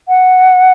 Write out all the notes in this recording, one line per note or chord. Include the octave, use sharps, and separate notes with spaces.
F#5